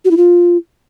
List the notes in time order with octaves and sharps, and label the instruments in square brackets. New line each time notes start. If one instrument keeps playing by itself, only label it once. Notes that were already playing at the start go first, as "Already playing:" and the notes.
[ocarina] F#4
E4
F4